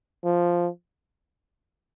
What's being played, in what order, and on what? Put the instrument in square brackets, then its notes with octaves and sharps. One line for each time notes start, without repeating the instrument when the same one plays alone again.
[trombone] F3